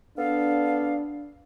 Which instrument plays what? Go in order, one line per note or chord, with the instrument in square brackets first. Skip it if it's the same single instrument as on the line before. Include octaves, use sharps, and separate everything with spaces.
[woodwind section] B3 A4 F5 [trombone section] D4